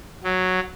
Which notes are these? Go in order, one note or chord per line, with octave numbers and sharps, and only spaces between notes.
F#3